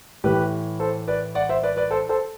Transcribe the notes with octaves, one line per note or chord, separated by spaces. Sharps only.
A2 E3 G4 B4
A4 C5
B4 D5
D5 F#5
C5 E5
B4 D5
B4 D5
A4 C5
A4 C5